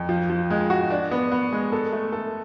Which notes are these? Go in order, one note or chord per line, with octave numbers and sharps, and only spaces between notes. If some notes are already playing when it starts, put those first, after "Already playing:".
Already playing: F2
F3
F3
G#3
F#4
D4
B3
B3
G#3
A4
A3
A4